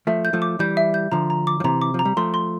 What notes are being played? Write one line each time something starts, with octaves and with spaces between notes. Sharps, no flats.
F3 A3 E5
G6
F3 A3
D6
E3 G3 G6
E5
G6
D3 F3 A#5
A#5
D6
F3
C3 E3 A#5
D6
F3
A#5
G3
F3 A3 C6
C6